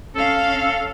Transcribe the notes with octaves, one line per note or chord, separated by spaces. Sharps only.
C#4 A4 F5